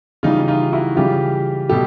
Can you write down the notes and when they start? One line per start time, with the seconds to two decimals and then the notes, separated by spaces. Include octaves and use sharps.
0.23 C#3 E3 G3 D#4 F4
0.48 D#4 F4
0.72 E4 F#4
0.96 C#3 E3 G3 F4 G4
1.69 B2 G3 G4 A4